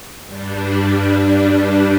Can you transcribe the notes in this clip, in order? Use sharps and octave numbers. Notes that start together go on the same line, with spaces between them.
G2 G3 D4